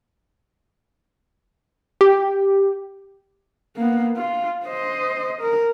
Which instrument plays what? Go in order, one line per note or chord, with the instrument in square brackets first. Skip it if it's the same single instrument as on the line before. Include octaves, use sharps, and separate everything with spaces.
[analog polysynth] G4
[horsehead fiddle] A#3 B3
F4
C5 D#5
A#4